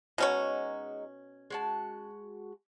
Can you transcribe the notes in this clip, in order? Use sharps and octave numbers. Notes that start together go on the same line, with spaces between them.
B2 G#3 C#4 D#4 F#4 C#5
G#3 F#4 A5